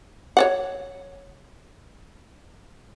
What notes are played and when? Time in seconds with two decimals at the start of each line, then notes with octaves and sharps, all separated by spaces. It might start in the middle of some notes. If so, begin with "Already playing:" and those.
0.37 C#5 D5 F#5